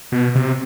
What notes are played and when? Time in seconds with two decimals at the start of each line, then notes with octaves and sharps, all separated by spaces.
0.12 B2
0.35 C3